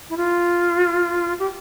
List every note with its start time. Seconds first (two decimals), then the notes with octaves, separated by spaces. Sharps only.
0.09 E4
0.16 F4
1.39 G4